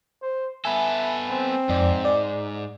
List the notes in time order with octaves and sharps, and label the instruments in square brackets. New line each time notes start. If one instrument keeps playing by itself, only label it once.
[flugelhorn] C5
[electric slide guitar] B3 A4 [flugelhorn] E5 [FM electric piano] G#5 B5
[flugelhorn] C4
[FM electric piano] F2 D5 [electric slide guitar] G#2
[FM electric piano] D5